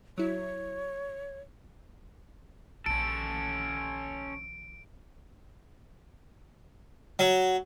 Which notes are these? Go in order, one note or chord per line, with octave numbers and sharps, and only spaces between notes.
F#3 E4 C#5
A#1 D#3 C#4 A4 D7
F#3